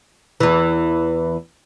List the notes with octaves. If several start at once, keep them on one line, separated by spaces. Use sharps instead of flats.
E2 E3